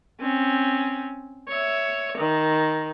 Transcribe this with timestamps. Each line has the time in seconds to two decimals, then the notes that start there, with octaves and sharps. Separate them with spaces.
0.20 C4 C#4
1.48 C#5 E5
2.18 D#3